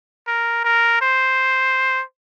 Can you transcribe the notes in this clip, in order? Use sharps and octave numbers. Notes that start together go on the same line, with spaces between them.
A#4
A#4
C5